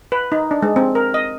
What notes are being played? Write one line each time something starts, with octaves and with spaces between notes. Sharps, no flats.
B4
D#4
D4
G#3
C4
A#4
D#5